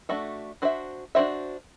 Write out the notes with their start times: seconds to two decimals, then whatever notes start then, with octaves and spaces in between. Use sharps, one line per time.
0.09 A3 D4 F#4 A4 E5
0.62 D4 F#4 C5 E5
1.15 D4 F#4 C5 E5